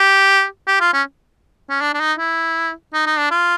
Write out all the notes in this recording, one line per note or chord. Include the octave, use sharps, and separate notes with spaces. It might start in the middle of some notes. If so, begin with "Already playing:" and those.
Already playing: G4
G4
F4
C#4
C#4
D4
D4
D#4
E4
D#4
D#4
D4
F4